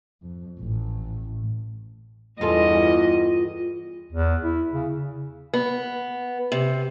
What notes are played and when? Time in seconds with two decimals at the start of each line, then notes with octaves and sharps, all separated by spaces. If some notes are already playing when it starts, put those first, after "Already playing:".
0.22 F2
0.60 A1 A2
2.41 E2 G2 F4 G#4 A4 D#5
4.12 E2
4.43 E4
4.73 C#3
5.54 B3
6.52 C3